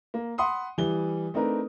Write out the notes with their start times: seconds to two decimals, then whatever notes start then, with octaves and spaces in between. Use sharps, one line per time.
0.14 A#3
0.38 F#5 B5 C6 D#6
0.78 E3 G3 G7
1.34 A3 C4 D4 D#4 A#4 B4